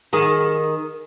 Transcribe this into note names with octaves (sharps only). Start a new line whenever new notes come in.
D#3 G#4